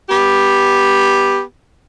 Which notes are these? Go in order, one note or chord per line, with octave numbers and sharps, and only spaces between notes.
B3 G4